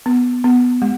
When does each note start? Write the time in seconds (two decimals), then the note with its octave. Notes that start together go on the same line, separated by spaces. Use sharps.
0.06 B3
0.44 B3
0.82 G#3